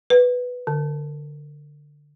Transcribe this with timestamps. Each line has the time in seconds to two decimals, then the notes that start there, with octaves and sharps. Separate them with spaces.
0.10 B4
0.67 D3